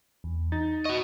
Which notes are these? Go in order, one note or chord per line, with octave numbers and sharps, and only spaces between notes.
E2
D#4 A6
F#4 D#5 C#6